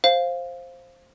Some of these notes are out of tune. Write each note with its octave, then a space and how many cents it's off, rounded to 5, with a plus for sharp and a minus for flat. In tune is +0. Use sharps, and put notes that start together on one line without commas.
C5 +10 F5 +0